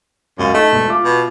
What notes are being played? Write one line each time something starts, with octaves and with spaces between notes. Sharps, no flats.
C#2 F#2 F5
A3 D#4
E1
F4 E5 D6
B2